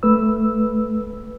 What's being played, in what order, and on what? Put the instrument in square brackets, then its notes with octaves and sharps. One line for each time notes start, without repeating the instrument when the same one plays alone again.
[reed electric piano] A3 B4 E6